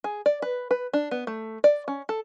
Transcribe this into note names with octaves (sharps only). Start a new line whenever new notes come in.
G#4
D5
B4
B4
D4
B3
A3
D5
C#4
A4